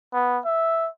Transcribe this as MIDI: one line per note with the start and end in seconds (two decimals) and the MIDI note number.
0.13 0.39 59
0.45 0.89 76